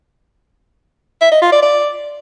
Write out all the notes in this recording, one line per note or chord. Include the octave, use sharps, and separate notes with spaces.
E5
D#5
F4
D5
D5